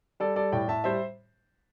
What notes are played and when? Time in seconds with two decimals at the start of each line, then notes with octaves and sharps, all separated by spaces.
0.20 G3 A4 D5
0.36 G3 A4 D5
0.52 A2 D5 G5
0.68 A2 E5 A5
0.84 G3 C5 E5